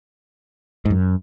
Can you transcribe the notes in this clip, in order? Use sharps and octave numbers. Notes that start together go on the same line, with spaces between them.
G#2
F#2